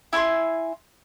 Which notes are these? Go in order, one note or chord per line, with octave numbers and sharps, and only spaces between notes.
E4 G#5 B5 C6